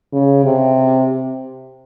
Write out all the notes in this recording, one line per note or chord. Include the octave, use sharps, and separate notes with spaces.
C#3
C3